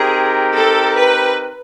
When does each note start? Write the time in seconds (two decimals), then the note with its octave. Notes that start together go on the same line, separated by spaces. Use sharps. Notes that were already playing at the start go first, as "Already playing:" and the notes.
Already playing: C4 D#4 G4 G#4 A#4
0.56 A4
0.96 B4